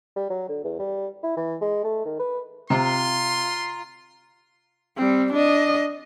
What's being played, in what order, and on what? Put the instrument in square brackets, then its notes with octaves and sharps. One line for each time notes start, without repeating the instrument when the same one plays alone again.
[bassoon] G3
F#3
D3
E2
G3
E4
E3
G#3
A3
D#3
B4
[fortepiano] C3 [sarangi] F4 [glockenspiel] A#5 [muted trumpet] C6
[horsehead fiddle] G3 C4
D4 D#5